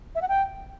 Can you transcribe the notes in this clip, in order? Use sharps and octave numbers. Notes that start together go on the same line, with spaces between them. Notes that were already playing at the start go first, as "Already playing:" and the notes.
E5
F#5
G5